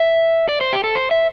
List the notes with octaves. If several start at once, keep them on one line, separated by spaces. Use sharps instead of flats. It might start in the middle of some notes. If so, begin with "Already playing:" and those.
Already playing: E5
D5
C5
G4
A4
C5
E5